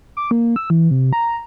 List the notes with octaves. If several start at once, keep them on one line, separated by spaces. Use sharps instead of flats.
D6
A#3
E6
E3
C3
A#5